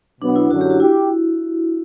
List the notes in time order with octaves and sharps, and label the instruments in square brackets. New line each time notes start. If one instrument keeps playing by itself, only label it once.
[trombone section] B2 F#3 B3 [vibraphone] D4
[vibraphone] E4
[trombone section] F#2 D3 F#3 C#4 [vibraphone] F#4
[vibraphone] G4
F#4
[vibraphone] E4 [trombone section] G4